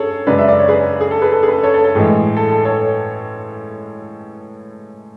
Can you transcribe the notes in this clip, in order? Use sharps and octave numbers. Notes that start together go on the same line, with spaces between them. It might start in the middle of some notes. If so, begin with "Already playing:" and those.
Already playing: F#2 G#4 A4 C#5
F#2 C#3 G#3 B4 D5
E5
D5
C#5
G#4 B4
G#4
A4
G#4 B4
A4
G#4
B4
A4
A4 C#5
A4
A4
A2 E3 G#3 G#4
A4
A4
A4 C#5